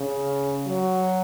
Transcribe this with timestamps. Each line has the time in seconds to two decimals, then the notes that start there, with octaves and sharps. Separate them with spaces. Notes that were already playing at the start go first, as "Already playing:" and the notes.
Already playing: C#3
0.67 F#3